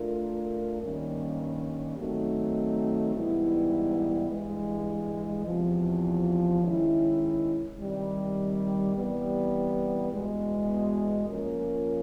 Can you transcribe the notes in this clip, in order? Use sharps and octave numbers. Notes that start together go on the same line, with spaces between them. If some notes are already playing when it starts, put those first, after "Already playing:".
Already playing: A3 D4 F4 A#4
G2 D#3 G3 A#3 C#4
D#3 F#3 A3 C4 D#4
G#2 E3 G3 B3 E4
G2 E3 G#3
E2 C3 F3
D#3 G#3 C#4 E4
C3 D#3 G3
C3 E3 G3 B3
E2 B2 G#3
F3 A#3 C#4 F4 A#4